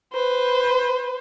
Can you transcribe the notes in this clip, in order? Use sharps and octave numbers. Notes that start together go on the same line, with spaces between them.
B4 C5